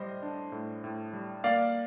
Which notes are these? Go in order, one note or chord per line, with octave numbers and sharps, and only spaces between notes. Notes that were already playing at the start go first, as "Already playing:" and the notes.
Already playing: A2 G3 C5 D#5
D4
A2
A2
G3
A#3 D5 F5